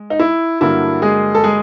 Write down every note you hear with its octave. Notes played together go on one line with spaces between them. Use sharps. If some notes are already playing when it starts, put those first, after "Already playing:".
Already playing: G#3
D#4
E4
G2 D3 F#3 A#3 E4
G#3 G#4
A4
G#3 G#4